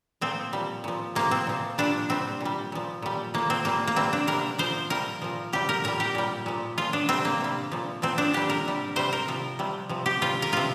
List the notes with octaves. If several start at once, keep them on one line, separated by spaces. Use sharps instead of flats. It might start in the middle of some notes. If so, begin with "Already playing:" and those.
A#2 F3 C4
A#2 G3
A#2 F3
C3 F3 A#3
C4
A#2 F3
A#2 G3 D4
C3 G3 C4
A#2 G3
A#2 F3
A#2 G3
A#2 F3 A#3
C4
A#2 G3 A#3
A#3
C3 G3 C4
D4
C3 G3 A#4
A#2 F3 C5
C3 G3 A#4
A#2 F3
C3 G3 G4
A#4
A#2 G3 A#4
G4
A#2 G3
A#2 F3
A#2 F3 F4
D4
C3 G3 C4
A#3
C3 G3
A#2 F3
A#2 F3 C4
D4
A#2 G3 G4
A#4
C3 G3
C3 G3 C5
A#4
C3 F3
C3 G3
C3 F3
G4
C3 G3 F4
A#4
C3 F3 F4